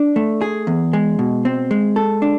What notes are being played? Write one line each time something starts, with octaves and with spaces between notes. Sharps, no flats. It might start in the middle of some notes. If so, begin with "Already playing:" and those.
Already playing: D4
A3
G#4
E2
G#3
B2
C4
G#3
A4
D4